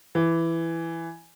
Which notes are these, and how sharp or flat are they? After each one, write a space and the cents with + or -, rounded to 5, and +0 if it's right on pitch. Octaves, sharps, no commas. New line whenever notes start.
E3 +10